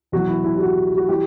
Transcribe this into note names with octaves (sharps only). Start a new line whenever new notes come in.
E2 B2 F#3 F#4
E4
E4
G4
F#4
F#4
E3 G3 G4